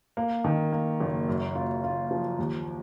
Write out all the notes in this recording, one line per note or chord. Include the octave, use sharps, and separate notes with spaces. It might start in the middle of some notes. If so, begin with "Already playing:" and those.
A#3
D#3
A#3
F#1
F#2
F4
F4
F3
D#2